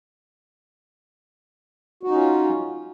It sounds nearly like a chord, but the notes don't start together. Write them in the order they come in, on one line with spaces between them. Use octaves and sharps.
F#4 D#4 C#4 F4